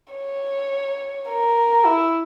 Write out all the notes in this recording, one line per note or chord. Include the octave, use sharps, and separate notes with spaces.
C#5
A#4
E4